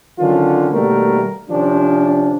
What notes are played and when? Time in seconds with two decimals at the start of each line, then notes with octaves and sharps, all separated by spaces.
0.19 D3 D#3 F#3 C4 C#4 F4
0.72 B2 D#3 G3 A3 A#3 A#4
1.49 C3 D#3 F3 C#4 D4